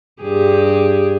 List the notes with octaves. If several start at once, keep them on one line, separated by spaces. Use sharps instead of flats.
G2 G4 G#4